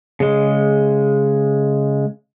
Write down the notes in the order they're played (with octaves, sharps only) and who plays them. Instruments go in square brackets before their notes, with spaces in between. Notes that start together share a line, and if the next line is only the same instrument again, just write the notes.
[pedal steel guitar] C#3 G#3